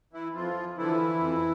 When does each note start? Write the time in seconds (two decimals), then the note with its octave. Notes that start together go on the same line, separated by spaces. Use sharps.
0.13 E3 E4
0.35 F2 F3 F4
0.77 D3 E3 F3 E4
1.20 F2